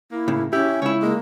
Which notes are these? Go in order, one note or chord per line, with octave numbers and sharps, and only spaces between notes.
A#3 E4
A2 C#3
C#4 E4 G4
C#2 E4 C#5
G#3 A#3